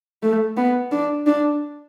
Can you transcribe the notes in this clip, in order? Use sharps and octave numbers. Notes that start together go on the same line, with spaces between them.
A3
B3
D4
D4